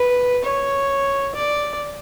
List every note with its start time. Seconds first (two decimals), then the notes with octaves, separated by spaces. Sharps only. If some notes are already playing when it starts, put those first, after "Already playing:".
Already playing: B4
0.44 C#5
1.34 D5